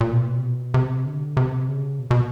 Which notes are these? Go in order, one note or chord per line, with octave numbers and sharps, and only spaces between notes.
A#2
B2
C3
B2
C3
D3
C3
C#3
B2
B2